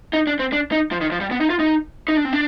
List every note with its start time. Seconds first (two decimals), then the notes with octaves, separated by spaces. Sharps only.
0.13 D#4
0.27 D4
0.39 C4
0.53 D4
0.72 D#4
0.92 F3
1.01 D#3
1.12 F3
1.21 G3
1.31 B3
1.41 D#4
1.50 F4
1.59 D#4
2.08 D#4
2.17 D4
2.25 C4
2.33 D4